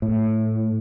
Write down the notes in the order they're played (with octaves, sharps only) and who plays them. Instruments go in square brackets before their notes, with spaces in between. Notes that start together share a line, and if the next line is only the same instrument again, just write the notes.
[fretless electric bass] A2